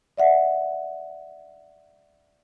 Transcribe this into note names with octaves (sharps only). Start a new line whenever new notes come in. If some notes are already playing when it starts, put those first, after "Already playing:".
D5 E5 F#5